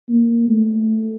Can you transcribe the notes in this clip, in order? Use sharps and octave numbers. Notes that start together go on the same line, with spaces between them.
A#3
A3